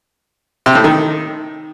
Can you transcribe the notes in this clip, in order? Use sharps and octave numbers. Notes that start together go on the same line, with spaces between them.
C3
A2
D#3